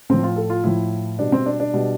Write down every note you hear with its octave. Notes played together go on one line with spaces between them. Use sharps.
A2 F3 C4
F4
A4
F4
A2 F3 E4
B2 G3 D4
C4
D4
D4
B2 G3